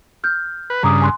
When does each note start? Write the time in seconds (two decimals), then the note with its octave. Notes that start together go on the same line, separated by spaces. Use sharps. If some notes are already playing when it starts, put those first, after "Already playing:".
0.24 F6 G6
0.70 B4
0.83 G2 C#3 A#5 D6 D#6
1.02 G#5 C6 F#6